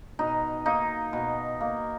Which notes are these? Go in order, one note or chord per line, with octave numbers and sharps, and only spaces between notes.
B2 D#4
A#3 D#4
B2
A#3